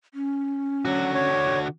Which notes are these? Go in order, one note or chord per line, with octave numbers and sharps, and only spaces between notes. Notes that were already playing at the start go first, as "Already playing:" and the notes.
C#4
D3 F#3 F#4
C#5